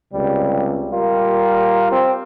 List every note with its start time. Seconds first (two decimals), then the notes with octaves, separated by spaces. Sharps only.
0.13 C#2 C3 G3
0.92 G3 F4 G4 A#4
1.92 C4